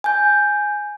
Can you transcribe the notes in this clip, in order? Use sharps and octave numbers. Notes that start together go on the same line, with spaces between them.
G#5 G6